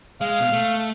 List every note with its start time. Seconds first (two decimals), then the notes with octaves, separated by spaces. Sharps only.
0.21 G#3 F5
0.40 B2
0.52 A3